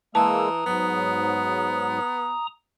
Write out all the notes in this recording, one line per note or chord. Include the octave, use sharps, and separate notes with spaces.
E3 G#3 A#3 A5 A#5 D#6 E6
G#2 F#3 B3